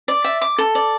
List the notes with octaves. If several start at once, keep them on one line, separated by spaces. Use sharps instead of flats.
D5
E5
D6
A4
D5